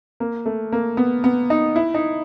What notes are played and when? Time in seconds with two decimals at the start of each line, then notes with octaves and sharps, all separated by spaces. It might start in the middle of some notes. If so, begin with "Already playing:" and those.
0.20 A#3
0.46 A3
0.72 A#3
0.97 B3
1.24 B3
1.50 D#4
1.76 E4
1.94 D#4